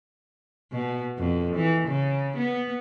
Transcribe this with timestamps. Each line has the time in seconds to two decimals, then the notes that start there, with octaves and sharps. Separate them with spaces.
0.72 B2
1.18 F2
1.55 E3
1.88 C#3
2.37 B3